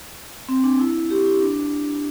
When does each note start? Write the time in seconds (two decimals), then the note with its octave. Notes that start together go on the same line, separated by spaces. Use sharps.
0.49 C4
0.64 D4
0.80 E4
1.10 G4
1.26 E4
1.41 D4